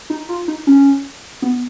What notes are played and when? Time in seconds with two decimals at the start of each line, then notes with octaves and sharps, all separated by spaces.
0.10 D#4
0.29 F4
0.48 D#4
0.67 C#4
1.42 B3